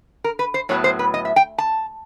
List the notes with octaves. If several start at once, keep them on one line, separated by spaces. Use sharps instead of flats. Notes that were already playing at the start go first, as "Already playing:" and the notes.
A#4
B4
C5
A2 F#3 B3 C#5
C5
B4
D#5
E5
G5
A5